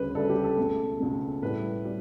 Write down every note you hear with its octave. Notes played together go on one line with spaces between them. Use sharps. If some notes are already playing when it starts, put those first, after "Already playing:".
Already playing: D2 C#3 G3 B4
D2 C#3 G3 A4
G4
A4
C#2 B2 A3
C#2 B2 A3
A2 G3 B4
G3